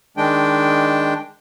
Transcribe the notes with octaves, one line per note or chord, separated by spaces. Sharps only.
D#3 G#3 D4 G5